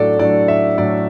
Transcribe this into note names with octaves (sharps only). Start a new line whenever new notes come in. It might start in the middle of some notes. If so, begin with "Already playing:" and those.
Already playing: A2 F#3 D4 A4 D5
A2 F#3 D4 D5
E5
A2 F#3 D4 D5